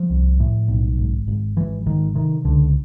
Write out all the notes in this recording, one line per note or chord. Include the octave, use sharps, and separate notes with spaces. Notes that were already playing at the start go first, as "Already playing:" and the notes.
Already playing: F3
C2
A2
B1
G#1
G#1
G#1 E3
G#1 D#3
C3 D#3
C#2 D3